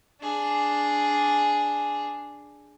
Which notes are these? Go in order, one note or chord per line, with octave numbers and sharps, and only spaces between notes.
D4 G#4